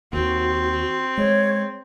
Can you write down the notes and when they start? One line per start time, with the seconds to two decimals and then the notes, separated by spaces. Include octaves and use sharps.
0.13 D#2 C4 F#4
1.17 G#3 C#5